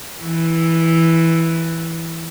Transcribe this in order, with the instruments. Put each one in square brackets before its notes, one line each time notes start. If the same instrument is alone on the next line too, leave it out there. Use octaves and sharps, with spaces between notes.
[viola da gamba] E3